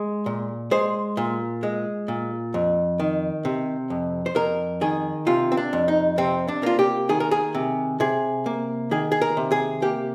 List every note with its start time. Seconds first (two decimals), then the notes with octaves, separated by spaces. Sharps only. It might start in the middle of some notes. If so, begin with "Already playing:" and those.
Already playing: G#3
0.26 A#2
0.71 G#3 C5
1.17 A#2
1.63 G#3
2.08 A#2
2.54 F2
3.00 D#3
3.45 C3
3.90 F2
4.26 C5
4.35 F2 A#4
4.81 D#3 G#4
5.27 C3 F4
5.52 C4
5.57 D4
5.73 F2
5.88 D#4
6.18 C3 C4
6.48 D4
6.63 A#3 F4
6.79 G4
7.09 D#3 G#4
7.20 A#4
7.31 G#4
7.55 C3
8.00 C3 G#4
8.46 A#3
8.91 D#3 G#4
9.12 G#4
9.21 A#4
9.37 C3
9.52 G#4
9.82 A#3 G4